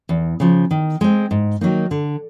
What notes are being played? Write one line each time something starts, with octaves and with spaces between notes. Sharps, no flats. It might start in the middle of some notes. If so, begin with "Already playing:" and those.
E2
C#3 F3
D#3
G#3 C4
G#2
D#3 F#3 A#3 D#4
D3